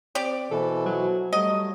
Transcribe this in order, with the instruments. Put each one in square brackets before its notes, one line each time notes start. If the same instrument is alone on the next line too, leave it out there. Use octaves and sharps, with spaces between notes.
[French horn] C4 [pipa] G4 D5
[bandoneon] B2 E3 [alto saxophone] A4 [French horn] C5
[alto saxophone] F#3
[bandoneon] F#3 [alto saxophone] G3 [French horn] A3 [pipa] D#5